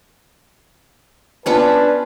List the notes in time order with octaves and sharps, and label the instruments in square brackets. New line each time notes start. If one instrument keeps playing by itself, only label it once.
[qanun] B3 C#4 F4 [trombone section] D4 [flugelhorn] B4 [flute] A5